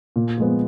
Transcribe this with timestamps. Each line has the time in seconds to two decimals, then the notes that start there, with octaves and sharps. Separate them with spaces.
0.16 A#2
0.38 F3 G#3 B3